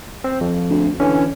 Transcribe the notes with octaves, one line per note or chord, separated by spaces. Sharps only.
C4
F2
D2
D3 E3 C#4